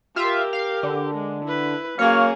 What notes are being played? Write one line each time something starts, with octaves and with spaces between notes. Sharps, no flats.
F4 G4 A#4 E5 F5
F5
D3
G#3
E4 B4
F#3 A#3 C#4 G#4 C#5 F5